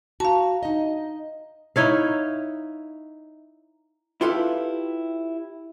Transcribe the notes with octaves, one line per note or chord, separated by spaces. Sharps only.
F#4 F5 A5 A#5
D#4 D#5
D#4 E4 C#5 F5
E4 F4 G4 A4 B4 F5